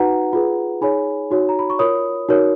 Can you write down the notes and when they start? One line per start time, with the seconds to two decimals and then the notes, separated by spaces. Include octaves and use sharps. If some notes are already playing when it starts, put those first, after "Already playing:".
Already playing: D#4 F#4 B4 F#5 A#5
0.33 F4 G#4 B4
0.81 D#4 G#4 C#5 G#5 B5
1.31 D#4 F#4 C#5
1.49 A#5
1.59 B5
1.70 C#6
1.79 F4 A#4 C#5 B5 D#6
2.29 D#4 F#4 A#4 C#5